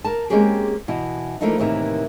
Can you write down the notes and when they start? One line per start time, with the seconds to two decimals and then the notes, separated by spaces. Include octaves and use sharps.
0.05 A#4 A5
0.30 G#3 A#3 C4 C#4 G4 G#4
0.88 B2 E3 E4
1.41 E3 F3 A3 A#3 D4 D#4
1.58 A2 C3 D#3 E3 G#3 A#3